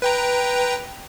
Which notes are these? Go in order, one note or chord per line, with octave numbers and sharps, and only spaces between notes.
B4 G5 A#5